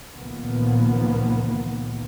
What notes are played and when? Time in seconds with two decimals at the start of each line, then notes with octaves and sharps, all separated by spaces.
0.15 C#2 A#2 D#3 F3 A#3 B3